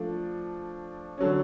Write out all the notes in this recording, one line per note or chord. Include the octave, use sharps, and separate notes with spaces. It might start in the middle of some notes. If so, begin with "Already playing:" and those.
Already playing: F3 A3 D4
D3 F#3 C#4